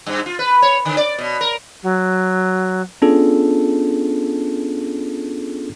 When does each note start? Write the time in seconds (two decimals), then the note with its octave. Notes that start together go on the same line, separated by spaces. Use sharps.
0.06 G2
0.26 F4
0.39 B4
0.62 C#5
0.85 D3
0.97 D5
1.18 B2
1.41 A#4
1.82 F#3
3.02 B3 C#4 D4 F4 G#4 A4